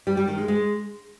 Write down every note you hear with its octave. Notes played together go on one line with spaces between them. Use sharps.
G3
G3
D#3
G#3
G#3